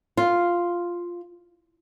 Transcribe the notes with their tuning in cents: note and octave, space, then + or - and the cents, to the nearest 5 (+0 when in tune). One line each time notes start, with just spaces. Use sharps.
F4 +0